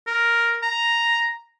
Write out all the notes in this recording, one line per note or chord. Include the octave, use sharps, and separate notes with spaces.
A#4
A#5